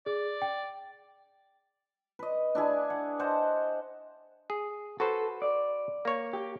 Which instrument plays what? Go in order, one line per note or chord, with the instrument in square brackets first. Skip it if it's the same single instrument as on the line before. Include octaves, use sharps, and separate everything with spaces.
[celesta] G#4 [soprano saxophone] D5
[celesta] G5
[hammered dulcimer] B4 D#5
D4 E4 G#4
F#5
C5 D#5 F#5 A5
[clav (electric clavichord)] G#4
[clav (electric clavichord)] F#4 B4 C5 [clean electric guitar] A4
[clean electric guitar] D5
[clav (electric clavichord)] A#3 C#5
[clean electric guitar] G4